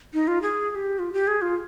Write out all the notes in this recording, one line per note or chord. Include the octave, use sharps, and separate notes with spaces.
D#4
F4
G#4
G#4
G4
F4
G4
G#4
F4